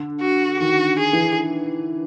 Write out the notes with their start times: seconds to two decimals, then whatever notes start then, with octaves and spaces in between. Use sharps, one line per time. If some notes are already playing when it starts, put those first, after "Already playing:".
Already playing: D3
0.21 F#4
0.60 D#3 F#4
0.99 G#4
1.13 E3